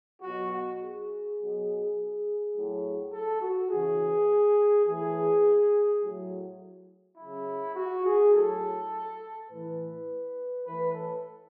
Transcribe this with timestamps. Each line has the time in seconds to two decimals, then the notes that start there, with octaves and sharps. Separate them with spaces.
0.22 B2 F#3 F#4
0.52 F#4
0.80 G#4
1.38 B2 F#3
2.54 A2 F#3
3.13 A4
3.42 F#4
3.70 C#3 E3 G#4
4.86 A2 E3 G#4
6.01 A2 F#3
7.18 C#3 F#3 E4
7.76 F#4
8.05 G#4
8.33 A2 F#3 A4
9.50 A2 E3 B4
10.66 A2 E3 B4
10.94 A4